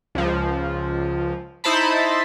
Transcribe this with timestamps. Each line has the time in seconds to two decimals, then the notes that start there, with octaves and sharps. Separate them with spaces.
0.15 C#2 F3
1.64 D#4 E4 C5 A5 B5